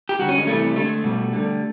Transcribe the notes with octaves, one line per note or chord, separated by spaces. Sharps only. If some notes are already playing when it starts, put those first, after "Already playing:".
G4
D3 G3 F#4
C#4
G#3
C3 E3 G3 A3
D3 F3 G#3 A3
B2 G3
D3 G3